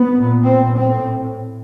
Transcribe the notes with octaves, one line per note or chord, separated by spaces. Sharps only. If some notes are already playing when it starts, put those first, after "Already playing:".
Already playing: B3
A#2
C4
A2 C4